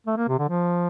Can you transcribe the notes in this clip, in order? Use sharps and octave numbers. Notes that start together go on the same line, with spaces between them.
A3
A#3
C3
D3
F3